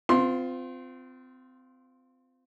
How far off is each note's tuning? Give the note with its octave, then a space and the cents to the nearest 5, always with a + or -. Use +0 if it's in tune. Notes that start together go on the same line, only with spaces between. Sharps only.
C4 -30 F4 +0 C6 +15